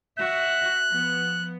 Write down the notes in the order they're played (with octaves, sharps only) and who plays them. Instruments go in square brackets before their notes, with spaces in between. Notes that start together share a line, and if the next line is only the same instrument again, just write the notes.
[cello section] F#4 E5 [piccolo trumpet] F#6
[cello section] F3 B3